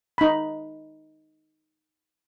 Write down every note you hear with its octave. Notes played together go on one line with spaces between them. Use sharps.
D#4 B5